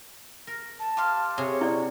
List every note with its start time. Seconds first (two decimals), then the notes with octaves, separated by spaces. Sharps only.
0.47 A#4
0.79 A5
0.97 G4 C5 F5
1.38 C3 G#4 C#5
1.61 E4 D5